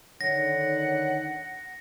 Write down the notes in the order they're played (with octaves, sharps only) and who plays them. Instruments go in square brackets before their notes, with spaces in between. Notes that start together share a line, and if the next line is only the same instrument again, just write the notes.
[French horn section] D3 D#3 [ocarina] C#5 [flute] F#5 [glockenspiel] A#6